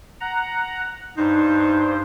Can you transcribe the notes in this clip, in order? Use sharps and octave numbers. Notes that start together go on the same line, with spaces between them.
F#5 A#5
G2 D#4 C5